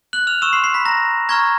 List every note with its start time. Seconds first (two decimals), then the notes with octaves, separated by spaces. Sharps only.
0.13 F#6 F#7
0.27 F6 F7
0.42 C#6 E6 F6 E7
0.53 C6 C7
0.64 C6 C7
0.74 B5 B6
0.85 A#5 A#6
1.29 A#5 C#6 F6 G#6